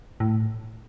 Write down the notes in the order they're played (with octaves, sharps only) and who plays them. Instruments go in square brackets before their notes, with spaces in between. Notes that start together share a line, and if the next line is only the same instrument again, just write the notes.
[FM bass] A2